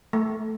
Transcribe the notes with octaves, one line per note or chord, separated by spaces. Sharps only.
A3